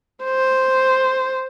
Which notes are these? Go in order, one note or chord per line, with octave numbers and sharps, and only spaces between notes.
C5